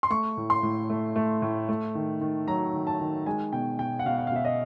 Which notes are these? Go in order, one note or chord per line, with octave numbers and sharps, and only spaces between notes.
C6
A3 C#6
A2
C6
A2
A3
A3
A2
A3
D#3
D#3
F#3 A#5
D#3
A5
D#3
G#3 G#5
B2 G5
B2 G5
F#5
B2 F5
F#5
F5
B2 E5
D#5